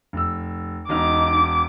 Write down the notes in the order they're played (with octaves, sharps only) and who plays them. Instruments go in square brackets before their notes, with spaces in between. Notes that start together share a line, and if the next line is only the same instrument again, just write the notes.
[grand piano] F1 E6
[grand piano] E1 D#5 F6 [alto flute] D#4 [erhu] D6